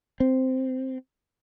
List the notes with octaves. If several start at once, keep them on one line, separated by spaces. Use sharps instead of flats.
C4